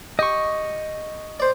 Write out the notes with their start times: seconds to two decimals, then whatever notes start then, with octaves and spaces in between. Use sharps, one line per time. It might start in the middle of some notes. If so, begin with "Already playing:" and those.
0.19 G4 D#5 C#6
1.40 C5 D5